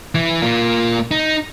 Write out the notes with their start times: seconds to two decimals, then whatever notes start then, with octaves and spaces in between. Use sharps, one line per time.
0.15 E3
0.42 A#3 F4
1.11 D#4